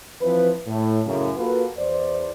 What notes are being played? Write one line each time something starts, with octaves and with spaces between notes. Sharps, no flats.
E3 F3 C4 B4
A2
F#2 A2 C#3
A#3 F4 F#4 A4 B4
E2 C5 D5